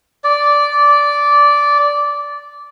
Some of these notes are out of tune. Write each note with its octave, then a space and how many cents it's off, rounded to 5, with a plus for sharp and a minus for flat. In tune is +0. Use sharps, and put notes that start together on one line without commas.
D5 -10